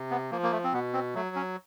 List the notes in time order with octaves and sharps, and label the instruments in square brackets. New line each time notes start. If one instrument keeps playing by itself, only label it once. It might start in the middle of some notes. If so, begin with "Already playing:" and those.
Already playing: [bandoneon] C3
B3
F3 A#3
A#3
A3
C4
B2 B3
C4
F#3 A3
C#4